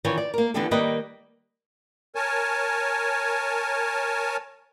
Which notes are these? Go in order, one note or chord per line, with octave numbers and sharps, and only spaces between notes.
D#3 E3 C#4 F4 C#5 D5
D5
A#3 A#4
D3 E3 B3 D4 G4 A4
D#3 G3 A#3 B4 D5 D#5
A#4 C#5 G#5 A5